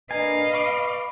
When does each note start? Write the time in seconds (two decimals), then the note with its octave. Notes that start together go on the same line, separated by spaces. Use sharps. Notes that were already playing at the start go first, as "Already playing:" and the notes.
0.11 D4 A#4 B4 D#5 F5 G#5
0.54 B5 C#6 D6